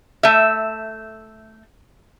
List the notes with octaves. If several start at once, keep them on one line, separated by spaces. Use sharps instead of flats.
A3 E5